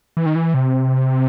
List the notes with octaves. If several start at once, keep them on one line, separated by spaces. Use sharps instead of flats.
E3
D#3
E3
C3